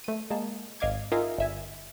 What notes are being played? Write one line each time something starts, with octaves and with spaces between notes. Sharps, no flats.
A3 D#7
G#3 A#3 A5
G#1 D#5 F5 D6 G#6
D#4 F4 G#4 A#4 E5 F5
G1 E5 G#5